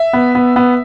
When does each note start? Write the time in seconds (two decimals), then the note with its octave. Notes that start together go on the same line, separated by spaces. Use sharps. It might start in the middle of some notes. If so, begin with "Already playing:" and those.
Already playing: E5
0.13 B3
0.35 B3
0.56 B3